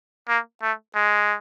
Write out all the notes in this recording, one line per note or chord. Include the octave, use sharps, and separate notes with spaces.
A#3
A3
G#3